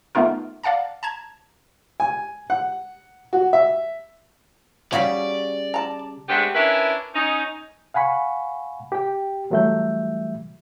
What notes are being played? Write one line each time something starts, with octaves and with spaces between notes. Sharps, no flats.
A3 B3 D#4 F4 A#4
D5 F5 F#5 A5 A#5
A5 A#5 G#6
G#5
F#5
F#4
E5
C#3 G3 F#4 C#5 D5 F5 B5
A5 A#5
G#3 A3 B3 C4 D4 G4
C#4 D4 E4 A#4 B4
C#4 D#4
F5 F#5 G#5 B5 C#6
G4 G5
E3 F#3 G3 A3 E5 G6